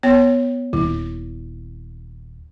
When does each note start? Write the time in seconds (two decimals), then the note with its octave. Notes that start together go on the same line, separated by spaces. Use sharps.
0.03 B3 C#5 G5
0.73 D#1 E4